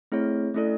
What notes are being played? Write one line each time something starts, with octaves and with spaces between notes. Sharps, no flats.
A3 C4 E4 G#4 C#5
A3 C#4 E4 A4 D5